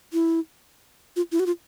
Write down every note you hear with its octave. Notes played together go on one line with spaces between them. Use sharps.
E4
F4
E4
F#4
F4